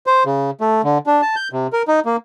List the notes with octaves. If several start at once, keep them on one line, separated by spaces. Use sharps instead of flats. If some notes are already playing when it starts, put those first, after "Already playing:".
C5
C#3
A3
D3
D4
A5
G6
C3
A#4
D#4
A#3